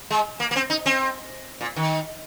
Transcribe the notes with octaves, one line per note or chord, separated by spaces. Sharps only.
G#3
A#3
A#3
C4
D#4
C4
A#2
D#3